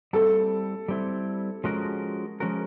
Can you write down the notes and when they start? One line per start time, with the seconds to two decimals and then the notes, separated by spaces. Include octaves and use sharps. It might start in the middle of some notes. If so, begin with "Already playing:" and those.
0.13 G3 C4 E4 A4
0.88 G3 C4 E4
1.64 F3 G#3 C#4 F#4 A#4
2.40 F3 G#3 C#4 F#4 A#4